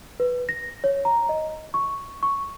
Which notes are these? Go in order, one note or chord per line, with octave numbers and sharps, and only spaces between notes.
B4
A#6
C#5
A#5
D#5
C#6
C#6